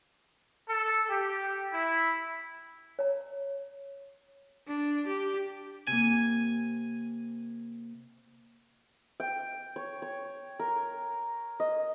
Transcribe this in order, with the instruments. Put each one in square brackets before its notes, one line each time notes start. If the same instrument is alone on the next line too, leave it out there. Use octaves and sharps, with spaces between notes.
[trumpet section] A4
G4
E4
[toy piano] C#5 A#5
[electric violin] D4
G4
[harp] C3 A#3 [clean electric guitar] G#5
[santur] G5
C#5
C#5
A#4
D#5